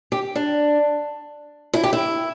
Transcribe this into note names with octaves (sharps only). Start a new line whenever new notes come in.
G4
D4
E4
G4
E4